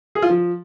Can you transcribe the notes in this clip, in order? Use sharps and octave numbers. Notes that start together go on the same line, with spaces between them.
G#4
F4
F3